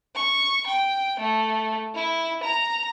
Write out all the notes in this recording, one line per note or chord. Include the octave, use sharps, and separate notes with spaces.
C#6
G5
A3
E4
A#5